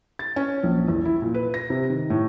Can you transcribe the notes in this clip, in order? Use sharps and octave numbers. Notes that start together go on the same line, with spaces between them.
A6
C#4
A#1
E2
E4
A#2
B4
A#6
C3
D#3
A2